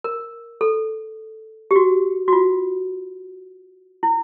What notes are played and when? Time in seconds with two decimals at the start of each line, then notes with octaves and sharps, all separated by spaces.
0.04 A#4
0.61 A4
1.71 G4
1.76 F#4
2.28 F#4
2.33 F4
4.03 E4